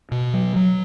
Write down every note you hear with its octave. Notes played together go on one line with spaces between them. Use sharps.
B2
F#3
F#3